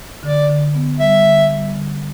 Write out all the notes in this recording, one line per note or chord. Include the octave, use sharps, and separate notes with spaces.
D3 D5
D3
B3
G3 E5
D3
G3
D3